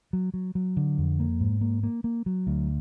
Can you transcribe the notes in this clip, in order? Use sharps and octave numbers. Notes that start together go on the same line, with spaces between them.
F#3
F#3
F#3
D3
F2
A#3
G#2
A#3
A#3
A#3
F#3
D2